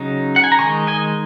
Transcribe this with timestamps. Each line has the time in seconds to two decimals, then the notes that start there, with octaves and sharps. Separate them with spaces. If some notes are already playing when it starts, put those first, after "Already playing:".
Already playing: C#3 F#3 D#4
0.36 F#5
0.44 G#5
0.52 A#5
0.59 D#3 G#3 D#4 G#5 C#6
0.87 D#5 G#5